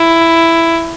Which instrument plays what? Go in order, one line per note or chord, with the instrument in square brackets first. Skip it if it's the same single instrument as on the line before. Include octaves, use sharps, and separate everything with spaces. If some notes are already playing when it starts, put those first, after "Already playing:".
Already playing: [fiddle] E4